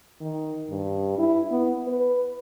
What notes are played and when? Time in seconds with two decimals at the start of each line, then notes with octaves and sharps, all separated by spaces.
0.21 D#3
0.70 G2
1.18 E4
1.51 B3
1.87 B4